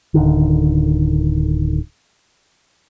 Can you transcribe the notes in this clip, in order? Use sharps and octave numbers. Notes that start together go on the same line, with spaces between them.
D1 D3 D#3